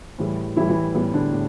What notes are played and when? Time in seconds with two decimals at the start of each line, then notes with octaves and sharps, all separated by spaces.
0.18 A2 E3 G3
0.56 A2 E3 G3 E4
0.69 E3 E4
0.95 A2 E3 G3 B3
1.13 D3 D4
1.32 A2